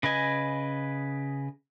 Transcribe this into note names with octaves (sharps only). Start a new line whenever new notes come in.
C#3 B4 D#5 G#5